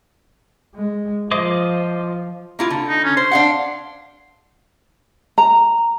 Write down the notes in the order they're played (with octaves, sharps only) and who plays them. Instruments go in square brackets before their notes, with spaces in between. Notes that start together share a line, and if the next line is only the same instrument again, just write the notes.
[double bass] G#3
[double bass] F3 [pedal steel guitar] C5 D#5 D6
[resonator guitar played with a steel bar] A#3 E4 F4
D3
[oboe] D#4
C#4
[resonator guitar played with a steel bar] C5 [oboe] C6
[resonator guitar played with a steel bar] D4 F5 F#5
[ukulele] A#5